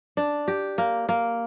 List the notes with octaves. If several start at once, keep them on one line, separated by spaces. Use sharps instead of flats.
D4
G4
A#3
A#3